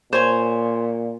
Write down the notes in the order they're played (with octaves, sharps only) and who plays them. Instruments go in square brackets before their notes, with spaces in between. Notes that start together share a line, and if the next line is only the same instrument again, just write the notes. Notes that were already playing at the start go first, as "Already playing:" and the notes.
[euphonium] A#2 [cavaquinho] C5 C#5 G#5